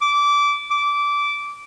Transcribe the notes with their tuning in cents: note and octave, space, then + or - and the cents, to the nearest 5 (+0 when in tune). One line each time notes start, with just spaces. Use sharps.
D6 -20
D6 -15